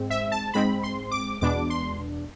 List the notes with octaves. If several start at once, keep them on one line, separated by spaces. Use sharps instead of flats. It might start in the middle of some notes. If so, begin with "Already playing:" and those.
Already playing: G#2 G#3 C4
E5
A5
G#2 G#3 C4 B5
C6
D6
E2 B2 G#3 B3 D4 D6
C6